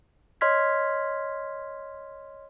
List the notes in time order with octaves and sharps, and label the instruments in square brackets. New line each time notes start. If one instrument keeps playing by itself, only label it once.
[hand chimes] C#5 D#5 C6 F6 G#6 B6